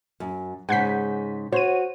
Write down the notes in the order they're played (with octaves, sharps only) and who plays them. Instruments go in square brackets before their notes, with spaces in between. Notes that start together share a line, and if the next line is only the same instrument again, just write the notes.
[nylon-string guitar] F#2
[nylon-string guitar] G#2 C#3 [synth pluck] F#5 G6 B6
[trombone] F#4 [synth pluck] C5 D#7 [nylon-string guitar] C#5